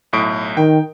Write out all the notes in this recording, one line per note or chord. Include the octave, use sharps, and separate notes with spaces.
B1 A2 D7
D#3 G5